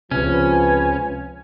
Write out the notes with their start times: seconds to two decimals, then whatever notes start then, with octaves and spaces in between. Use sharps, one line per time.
0.11 C#2 C3 F3 C#4 B4